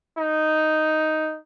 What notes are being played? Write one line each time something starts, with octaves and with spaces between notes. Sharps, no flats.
D#4